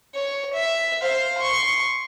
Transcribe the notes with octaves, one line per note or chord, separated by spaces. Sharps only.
C#5
E5
C5 F5
C6 C#6